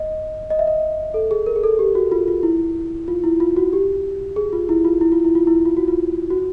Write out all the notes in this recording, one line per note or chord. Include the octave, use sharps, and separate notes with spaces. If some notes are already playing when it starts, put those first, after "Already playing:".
Already playing: D#5
D#5
E5
D#5
A4
G#4
A#4
G#4
A4
G4
F#4
F4
F4
E4
F4
E4
F4
F#4
G4
G#4
F4
E4
F4
E4
F4
E4
F4
E4
F4
F#4
F4
F#4